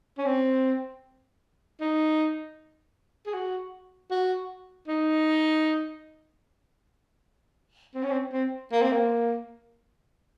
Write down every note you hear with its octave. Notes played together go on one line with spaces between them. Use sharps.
C#4
C4
D#4
G#4
F#4
F#4
D#4
C4
C#4
C4
C4
A#3
C4
A#3